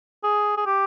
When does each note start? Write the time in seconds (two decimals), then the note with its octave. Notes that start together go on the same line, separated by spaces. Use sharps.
0.23 G#4
0.57 G#4
0.66 G4